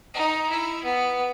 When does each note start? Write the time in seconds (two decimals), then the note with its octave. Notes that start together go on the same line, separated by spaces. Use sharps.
0.14 D#4
0.50 E4
0.84 B3